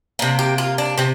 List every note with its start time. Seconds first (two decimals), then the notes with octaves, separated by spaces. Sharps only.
0.19 C3 A#3 D4
0.39 G4
0.58 F4
0.78 D4
0.98 C3 C4